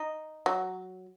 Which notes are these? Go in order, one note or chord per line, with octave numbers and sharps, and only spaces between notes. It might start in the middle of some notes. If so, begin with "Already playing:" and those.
Already playing: D#4
F#3